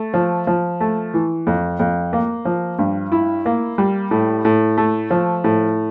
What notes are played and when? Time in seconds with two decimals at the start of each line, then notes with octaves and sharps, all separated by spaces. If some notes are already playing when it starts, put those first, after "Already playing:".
Already playing: A3
0.14 F3
0.47 F3
0.80 A3
1.14 E3
1.47 F2
1.80 F2
2.13 A#3
2.45 F3
2.79 G2
3.12 E4
3.46 A#3
3.78 G3
4.11 A2
4.45 A2
4.78 A3
5.10 F3
5.44 A2